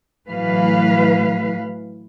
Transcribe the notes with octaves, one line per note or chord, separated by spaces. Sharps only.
A2 E3 F#3 B4 F5